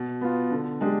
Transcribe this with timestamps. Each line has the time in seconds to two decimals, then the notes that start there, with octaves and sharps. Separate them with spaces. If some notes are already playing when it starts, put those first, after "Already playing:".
Already playing: B2
0.21 B3 F4
0.51 D3
0.81 G#3 D4 G4